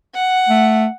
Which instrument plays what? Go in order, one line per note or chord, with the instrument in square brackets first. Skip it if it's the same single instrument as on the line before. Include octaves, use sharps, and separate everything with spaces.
[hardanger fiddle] F#5
[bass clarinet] A3